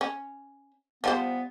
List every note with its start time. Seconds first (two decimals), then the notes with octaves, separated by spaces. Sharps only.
0.01 C#4
1.04 F3 G3 B3 C5